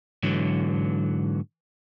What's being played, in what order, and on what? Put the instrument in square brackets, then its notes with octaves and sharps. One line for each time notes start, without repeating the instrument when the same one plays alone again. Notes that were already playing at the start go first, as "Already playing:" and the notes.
[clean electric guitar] G#2 D3 E3 F#3